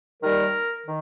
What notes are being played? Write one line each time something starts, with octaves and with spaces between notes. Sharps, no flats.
D#2 D#3 G3 A#4
D#3